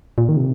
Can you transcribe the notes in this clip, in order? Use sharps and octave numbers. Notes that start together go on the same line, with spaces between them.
A#2
D#3
C3